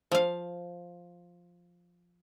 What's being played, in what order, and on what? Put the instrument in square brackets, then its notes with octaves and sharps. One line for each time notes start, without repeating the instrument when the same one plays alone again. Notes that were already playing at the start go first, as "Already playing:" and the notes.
[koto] F3 F5